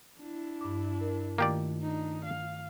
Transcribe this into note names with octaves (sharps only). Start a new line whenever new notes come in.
D4 E4
G2 D6
A#4
D#3 A3 A#3 F4 G4 D5
D4 D#4
F5